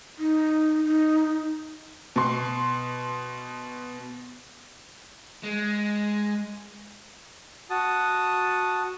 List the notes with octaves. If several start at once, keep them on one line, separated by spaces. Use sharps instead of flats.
D#4
D#4
B2 C6
G#3
F#4 A5 D#6